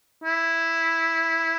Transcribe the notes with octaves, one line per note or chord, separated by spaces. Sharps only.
E4